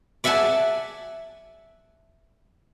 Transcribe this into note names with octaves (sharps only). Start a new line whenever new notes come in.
D5 E5 F#5 G#5 A5